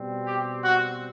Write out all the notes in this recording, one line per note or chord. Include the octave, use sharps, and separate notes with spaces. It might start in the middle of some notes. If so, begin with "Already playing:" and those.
Already playing: B2 G3 C4
G4
F#4